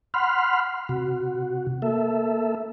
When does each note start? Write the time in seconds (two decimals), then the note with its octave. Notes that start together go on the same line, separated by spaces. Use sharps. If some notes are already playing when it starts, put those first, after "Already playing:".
0.14 F#5 B5 C6 F6
0.89 C3 F#4
1.82 A#3 A4 E5